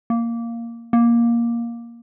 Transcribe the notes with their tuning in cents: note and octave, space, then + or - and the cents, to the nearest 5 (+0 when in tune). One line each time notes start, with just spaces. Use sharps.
A#3 -5
A#3 +10